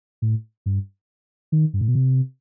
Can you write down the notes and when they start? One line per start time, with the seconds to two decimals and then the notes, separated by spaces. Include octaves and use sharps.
0.22 A2
0.66 G2
1.52 D#3
1.74 G2
1.81 A2
1.88 B2
1.95 C3